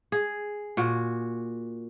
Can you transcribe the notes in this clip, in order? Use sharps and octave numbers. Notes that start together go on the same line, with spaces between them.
G#4
A#2 F#4